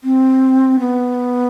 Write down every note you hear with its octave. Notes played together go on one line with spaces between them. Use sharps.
C4
B3